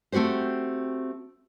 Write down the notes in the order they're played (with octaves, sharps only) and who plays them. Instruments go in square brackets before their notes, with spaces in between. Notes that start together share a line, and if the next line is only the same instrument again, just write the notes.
[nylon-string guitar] A3 C4 F#4 G4 C5